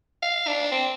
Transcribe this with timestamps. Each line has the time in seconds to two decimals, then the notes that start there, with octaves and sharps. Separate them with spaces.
0.22 F5
0.47 D4
0.72 C4